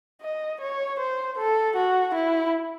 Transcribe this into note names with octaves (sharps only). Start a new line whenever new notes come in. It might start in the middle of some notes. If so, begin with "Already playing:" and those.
D#5
C#5
C5
A4
F#4
E4